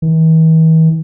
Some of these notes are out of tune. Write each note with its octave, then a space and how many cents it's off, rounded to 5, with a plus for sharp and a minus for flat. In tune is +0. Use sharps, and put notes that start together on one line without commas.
E3 -45